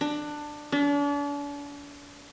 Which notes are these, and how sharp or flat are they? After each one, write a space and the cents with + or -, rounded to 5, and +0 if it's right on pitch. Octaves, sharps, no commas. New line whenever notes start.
D4 +15
D4 -40